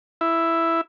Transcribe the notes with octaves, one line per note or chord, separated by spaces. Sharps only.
E4